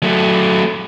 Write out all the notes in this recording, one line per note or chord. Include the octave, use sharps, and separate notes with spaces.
F#3 A3